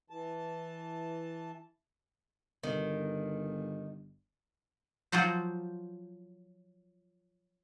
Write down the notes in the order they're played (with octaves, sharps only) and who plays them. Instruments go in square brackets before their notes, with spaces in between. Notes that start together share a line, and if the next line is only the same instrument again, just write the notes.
[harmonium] E3 A5
[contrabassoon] G1 [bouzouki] D#3
[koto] F3 F#3 F4 F#4 C5